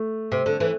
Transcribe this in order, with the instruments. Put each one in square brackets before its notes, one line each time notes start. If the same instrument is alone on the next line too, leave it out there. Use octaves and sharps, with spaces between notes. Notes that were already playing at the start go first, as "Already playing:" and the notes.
Already playing: [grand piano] A3
[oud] C3
D3
E3